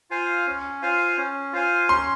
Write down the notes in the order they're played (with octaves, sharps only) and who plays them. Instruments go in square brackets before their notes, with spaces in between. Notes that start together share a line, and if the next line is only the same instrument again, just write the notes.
[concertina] F4 C5 F5 G#5
C#4
F4 C5 F5 G#5
C#4
F4 C5 F5 G#5
[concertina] C#4 [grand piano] C6